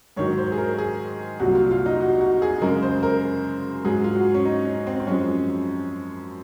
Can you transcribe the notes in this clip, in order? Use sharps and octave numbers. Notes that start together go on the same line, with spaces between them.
G#2 D#3 F#3 C#5
C5
G#4
A#4
G#4
C2 A#2 F#3 F#4
F4
F4
D#4
F#4
F#4
G#4
F#2 C#3 G#3 A#4
C5
A#4
G#2 F#3 G#4
F4
F#4
C#4
D#4
C#4
C4
C4
F#2 F3 G#3 C#4